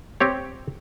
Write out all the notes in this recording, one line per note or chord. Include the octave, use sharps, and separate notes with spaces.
C4 G4 C#5